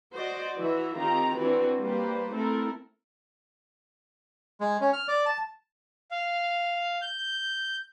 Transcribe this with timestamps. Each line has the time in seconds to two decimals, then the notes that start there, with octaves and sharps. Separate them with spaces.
0.14 F#4 C5 D5 D#5
0.57 E3 F#4 E5
0.95 D#3 C4 F4 G4 A#5
1.36 E3 C4 D4 F#4 B4
1.80 G3 A#3 G4 B4 C5
2.31 A3 C4 E4 A4 A#4
4.61 G#3
4.81 C#4
4.93 F6
5.08 D5
5.26 A5
6.10 F5
7.02 G6